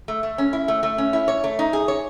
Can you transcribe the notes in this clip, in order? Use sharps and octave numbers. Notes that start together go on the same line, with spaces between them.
A3
A3
C#4
E4
A3
A3
C#4
E4
C#5
A3
D#4
G#4
C#5